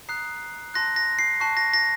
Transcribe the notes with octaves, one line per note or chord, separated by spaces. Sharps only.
A#5 D#6 F#6 C7
A5 C6 F#6 A#6
A#6
C7
A5 C#6 F#6 C7
A#6
A#6